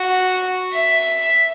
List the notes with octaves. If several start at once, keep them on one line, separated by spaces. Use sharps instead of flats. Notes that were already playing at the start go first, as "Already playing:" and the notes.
Already playing: F#4
E5